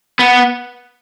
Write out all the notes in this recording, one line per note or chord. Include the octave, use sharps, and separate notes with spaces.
B3